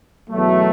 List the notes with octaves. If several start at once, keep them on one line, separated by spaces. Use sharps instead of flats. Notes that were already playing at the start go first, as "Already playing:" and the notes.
E2 B2 F#3 A3